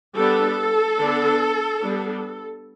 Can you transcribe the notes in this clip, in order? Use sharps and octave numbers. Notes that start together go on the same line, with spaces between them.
G3 B3 D4 A4
D3 B3 D4
G3 B3 D4